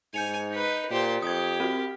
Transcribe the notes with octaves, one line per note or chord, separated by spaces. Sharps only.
G#2 G#5 G6 C#7 F7
D#4 B4
A#2 G4 C5
F2 G4 D#6 G#6
C4 F#4